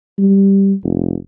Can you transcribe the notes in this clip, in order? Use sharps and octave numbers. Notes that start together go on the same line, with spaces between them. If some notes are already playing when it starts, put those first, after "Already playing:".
G3
F1